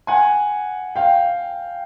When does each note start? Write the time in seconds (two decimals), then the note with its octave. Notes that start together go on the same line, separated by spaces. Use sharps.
0.07 F#5 G#5
0.96 F5 G5